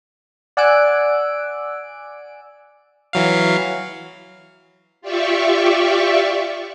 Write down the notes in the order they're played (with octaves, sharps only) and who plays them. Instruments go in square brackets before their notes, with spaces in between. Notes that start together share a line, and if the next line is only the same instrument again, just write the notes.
[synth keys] D5 F#5 G#5 E6 F#6 D7
[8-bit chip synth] E3 F#3 F5
[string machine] F4 G4 D5 E5 C#6